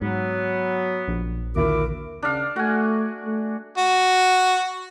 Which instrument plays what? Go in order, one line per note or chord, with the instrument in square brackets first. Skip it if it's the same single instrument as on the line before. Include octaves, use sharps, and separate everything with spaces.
[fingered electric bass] G#2 [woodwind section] F#3 B3
[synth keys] A#1
[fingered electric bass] D#2 A#2 D3 [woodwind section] E4 F#4 D6 [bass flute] A#4
[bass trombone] C#3 [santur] D4 F5
[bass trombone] A3 [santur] F#4 G#5
[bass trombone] A3
[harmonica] F#4